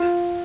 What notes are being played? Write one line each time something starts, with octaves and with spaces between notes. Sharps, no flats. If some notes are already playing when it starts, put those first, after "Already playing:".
Already playing: F4